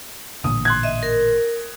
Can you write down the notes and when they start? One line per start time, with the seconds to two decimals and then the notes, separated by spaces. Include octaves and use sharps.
0.44 A1 A#2 D3 D#6
0.65 C6 F#6 G#6
0.83 D#5 E5
1.03 A#4